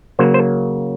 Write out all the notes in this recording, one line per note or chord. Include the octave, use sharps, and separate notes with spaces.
C#3 F#3 A#3 C5
C5